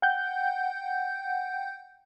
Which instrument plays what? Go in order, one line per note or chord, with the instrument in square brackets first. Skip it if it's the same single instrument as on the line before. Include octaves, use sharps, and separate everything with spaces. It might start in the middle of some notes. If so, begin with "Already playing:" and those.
[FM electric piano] F#5 G5 G6